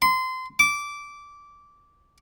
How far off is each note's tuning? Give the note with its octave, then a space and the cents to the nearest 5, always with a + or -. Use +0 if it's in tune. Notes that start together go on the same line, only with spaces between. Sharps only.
C6 -25
D6 -15